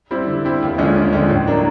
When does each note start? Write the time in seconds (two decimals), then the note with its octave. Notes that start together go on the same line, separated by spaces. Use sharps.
0.11 G3 C4 E4
0.27 D3
0.45 G3 C4 E4
0.62 D#2
0.78 D3 F3 G#3 C#4
0.96 D#2
1.13 D3 F3 G#3 C#4
1.29 A2
1.47 F#3 A#3 D4